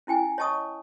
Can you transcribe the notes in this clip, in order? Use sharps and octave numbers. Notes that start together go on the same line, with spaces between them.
C#4 E4 G5 G#5
C#5 D#5 A5 C#6 D#6